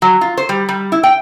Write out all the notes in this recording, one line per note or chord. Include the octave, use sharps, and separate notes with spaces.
F#3
F4
C5
G3
G3
E4
G5